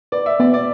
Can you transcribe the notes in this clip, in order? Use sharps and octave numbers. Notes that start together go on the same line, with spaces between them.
B4 D5
E5
B3 D5
D5